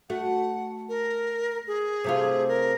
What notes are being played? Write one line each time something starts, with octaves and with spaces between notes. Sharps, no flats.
A3 F#4 F#5
A#4
G#4
C3 A3 F4
A#4